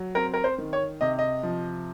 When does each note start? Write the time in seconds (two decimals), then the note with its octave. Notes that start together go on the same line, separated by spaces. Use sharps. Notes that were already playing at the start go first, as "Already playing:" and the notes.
Already playing: F#3
0.15 C4 A#4
0.34 A#4
0.44 C5
0.58 D#3
0.73 C#5
1.01 C3 D#5
1.19 D#5
1.43 F3